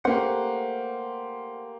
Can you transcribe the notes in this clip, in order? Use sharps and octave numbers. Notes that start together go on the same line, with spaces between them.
A3 A#3 G4 C5 F#5